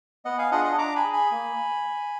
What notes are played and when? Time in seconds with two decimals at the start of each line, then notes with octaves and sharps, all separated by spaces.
0.25 B3 D#5 F#5
0.38 F5 G#5
0.51 D4 F4 G#4 D#5 F#5
0.65 D#5 F#5
0.78 D4 A#5 D6
0.96 G#5 B5
1.04 G#4
1.13 G#5 B5
1.31 A#3